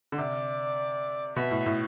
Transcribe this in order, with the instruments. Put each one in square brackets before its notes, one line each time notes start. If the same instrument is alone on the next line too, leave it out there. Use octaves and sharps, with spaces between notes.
[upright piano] D3
[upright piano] C3 [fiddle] D5
[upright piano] B2 [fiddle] E5
[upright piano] A2
A2